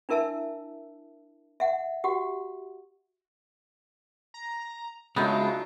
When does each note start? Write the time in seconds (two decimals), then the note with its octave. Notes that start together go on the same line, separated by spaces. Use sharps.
0.09 D4 E4 A#4 E5 A5 E6
1.60 E5 F#5
2.04 F#4 G4 F#5
4.34 A#5
5.16 C#3 F#3 G#3 A3 B3 D4 D#4 F4